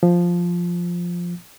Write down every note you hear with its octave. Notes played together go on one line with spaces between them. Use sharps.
F3